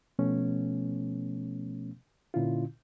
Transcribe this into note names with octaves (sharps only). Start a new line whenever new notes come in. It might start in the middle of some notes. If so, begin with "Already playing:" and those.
B2 F3 A3 B3 C#4
A#2 D3 C#4 E4 F4